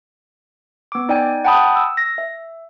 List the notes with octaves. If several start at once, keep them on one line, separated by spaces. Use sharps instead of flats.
B3 D6
D#4 D5 G5 G#5
F#5 G5 A5 B5 D#6
E6
A#6
E5